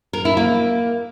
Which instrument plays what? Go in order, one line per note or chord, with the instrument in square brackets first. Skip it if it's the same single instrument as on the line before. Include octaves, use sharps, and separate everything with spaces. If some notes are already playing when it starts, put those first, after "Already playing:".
[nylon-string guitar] A#4
E4
A#3